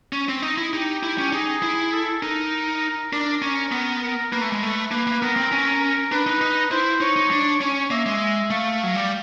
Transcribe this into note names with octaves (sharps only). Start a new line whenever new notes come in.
C#4
C4
D#4
E4
D#4 G4
E4
C#4
D#4 G#4
E4
A4
D#4 A#4
D4 A#4
C#4
B3
A#4
A#3 B4
A3
G#3
A3
A#3 B4
A#3
B3 A#4
C4
C#4
A#4
D4 B4
D#4
D#4
E4 C5
D#4 C#5
D#4
D4
C#4 C#5
A#3 E5
G#3
A3 F5
F#3
G3